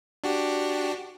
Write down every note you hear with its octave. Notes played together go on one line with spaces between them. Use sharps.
D4 F#4 G4